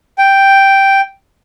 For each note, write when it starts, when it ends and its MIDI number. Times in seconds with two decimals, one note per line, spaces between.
0.18 1.00 79